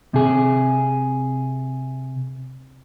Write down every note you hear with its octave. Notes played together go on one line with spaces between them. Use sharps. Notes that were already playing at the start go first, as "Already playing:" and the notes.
C3 G#4